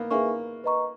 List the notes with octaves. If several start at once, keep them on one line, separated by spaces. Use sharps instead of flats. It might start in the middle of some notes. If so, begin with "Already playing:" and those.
Already playing: A#3 B3
A#3 G#4 B4 E5 G#5 C#6
B4 D#5 A#5 C#6